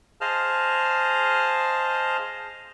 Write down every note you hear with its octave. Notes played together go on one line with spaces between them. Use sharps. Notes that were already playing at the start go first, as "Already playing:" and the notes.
G#4 C5 D#5 F5 A5 F6